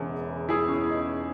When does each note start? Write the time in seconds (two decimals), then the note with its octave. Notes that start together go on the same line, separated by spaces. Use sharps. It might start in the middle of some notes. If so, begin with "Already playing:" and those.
Already playing: E1 E2 C#3 E3
0.49 E4 G#4
0.68 C#4
0.89 D#4